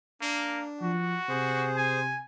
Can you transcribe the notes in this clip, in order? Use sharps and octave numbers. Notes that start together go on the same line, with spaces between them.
A#3 D4
F3 F#4
C3 G#4 C5
G#5